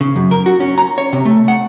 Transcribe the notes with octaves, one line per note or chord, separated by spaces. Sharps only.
C#3
F#2
A#4
F#4
C#4
A#5
C#5
C3
A3
F#5